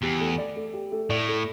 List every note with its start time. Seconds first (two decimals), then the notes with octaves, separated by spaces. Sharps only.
0.02 E2 G4
0.20 A3
0.38 D5
0.56 A3
0.74 G4
0.92 A3
1.10 A2 D5
1.28 A3